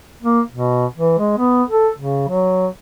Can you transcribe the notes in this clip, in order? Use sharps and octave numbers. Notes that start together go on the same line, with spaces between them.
A#3
B2
E3
G#3
B3
A4
C#3
F#3